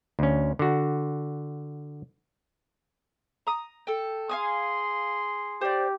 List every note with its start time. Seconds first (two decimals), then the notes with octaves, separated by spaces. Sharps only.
0.19 D2 C#4
0.59 D3 F#4
3.47 A#5 D#6
3.87 A4 G5
4.29 G#4 F5 G#5 C6 D#6
5.61 G4 C5 D5